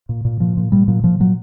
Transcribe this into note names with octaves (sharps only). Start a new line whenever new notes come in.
A#2
A#2
A#2 F3
A#2
A#2 G3
A#2 F#3
A#2 F3
A#2 F#3